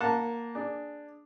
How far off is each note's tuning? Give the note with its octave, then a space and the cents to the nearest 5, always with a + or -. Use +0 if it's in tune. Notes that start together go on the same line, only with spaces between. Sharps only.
A#3 +0 F#5 -20 A5 +0
D4 +5 G#4 +0